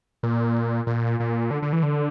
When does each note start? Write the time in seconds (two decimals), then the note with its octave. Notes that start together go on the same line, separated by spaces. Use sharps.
0.23 A#2
0.87 A#2
1.20 A#2
1.51 D3
1.62 D3
1.73 E3
1.83 D3